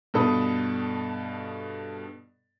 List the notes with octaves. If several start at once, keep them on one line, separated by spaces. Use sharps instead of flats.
G2 B2 A4 B5 D#6